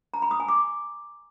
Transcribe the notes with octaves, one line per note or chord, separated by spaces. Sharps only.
A#5
B5
D#6
G#5
D6